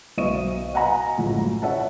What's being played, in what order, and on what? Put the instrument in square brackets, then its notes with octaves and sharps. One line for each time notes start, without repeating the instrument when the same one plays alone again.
[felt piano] B1 C5 D#5 E5 C#6 D#7
D#5 F5 F#5 G#5 A#5 B5
A#1 F#2 A2 G#3
C#5 E5 F#5 A5